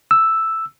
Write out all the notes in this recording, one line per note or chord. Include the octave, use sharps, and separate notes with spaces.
E6